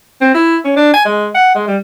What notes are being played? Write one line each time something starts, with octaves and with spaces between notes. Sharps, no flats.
C4
E4
C#4
D4
G#5
G#3
F#5
G#3
G3